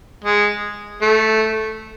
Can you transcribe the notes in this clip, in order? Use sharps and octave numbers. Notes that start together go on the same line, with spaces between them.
G#3
A3